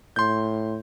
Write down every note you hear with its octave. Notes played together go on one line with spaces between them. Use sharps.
A2 C6 G6